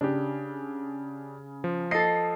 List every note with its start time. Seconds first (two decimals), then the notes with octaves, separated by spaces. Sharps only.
0.01 C#3 D4 G4
1.64 F3
1.91 A4 D#5 C7